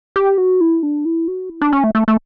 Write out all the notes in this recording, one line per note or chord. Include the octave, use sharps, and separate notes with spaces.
G4
F#4
E4
D4
E4
F#4
E4
D4
C#4
A3
A3
A3